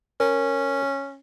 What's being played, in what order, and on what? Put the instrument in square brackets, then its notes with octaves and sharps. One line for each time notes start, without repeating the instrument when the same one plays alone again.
[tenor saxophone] C#4 [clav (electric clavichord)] A#4